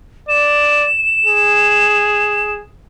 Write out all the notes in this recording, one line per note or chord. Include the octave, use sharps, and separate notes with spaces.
D5 E7
G#4